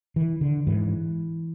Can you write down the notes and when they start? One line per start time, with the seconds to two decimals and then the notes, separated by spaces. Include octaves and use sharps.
0.16 E3
0.41 D3
0.67 G#2 E3